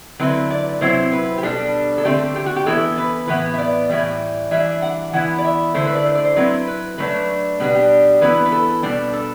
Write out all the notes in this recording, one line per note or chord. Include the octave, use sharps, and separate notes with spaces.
D3 F#3 C4 E4 B4
D5
C3 F#3 C4 E4 C5
B4
G4
B2 G3 D4 A4
A4
D3 A3 C4 G4
G4
F#4
G4
E3 B3 E4 A4
B4
A2 E3 B3 B4
E5
D5
A2 E3 G3 E5
E3 G3 D4 E5
F#5
E3 B3 E4 F#5
D5
E5
D3 A3 E4 C5
B4
D5
C5
D5
C5
F#3 C4 E4 B4
B4
F#3 A3 D4 B4
B2 G3 D4 B4
G4
E3 B3 E4 B4
B4
A4
B2 G3 D4
A4